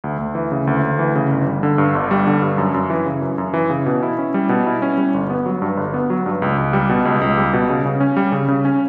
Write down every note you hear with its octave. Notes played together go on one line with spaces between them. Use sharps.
D2
D2
E3
C#3
D2
D2
E3
C#3
G1
G3
D3
G2
G1
G3
D3
G2
F#2
F#2
E3
C#3
F#2
F#2
E3
C#3
B2
E4
C#4
G3
B2
E4
C#4
G3
G1
B3
F#3
G2
G1
B3
F#3
G2
C#2
C#2
G3
B2
C#2
C#2
G3
B2
C#3
C#3
C#4
G3
C#3
C#3
C#4